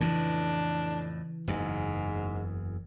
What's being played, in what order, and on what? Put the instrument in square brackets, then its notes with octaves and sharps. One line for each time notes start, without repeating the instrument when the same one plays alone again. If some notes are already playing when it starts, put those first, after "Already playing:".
[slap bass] F2 A2 [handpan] C#3 E3 [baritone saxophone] D4
[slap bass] F#1 E2 [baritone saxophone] G#2